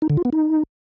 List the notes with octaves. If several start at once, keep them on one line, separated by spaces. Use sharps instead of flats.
D#4
D3
F4
B3
D#4